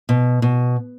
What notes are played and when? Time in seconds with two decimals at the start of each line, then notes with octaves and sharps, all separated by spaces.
0.09 B2
0.42 B2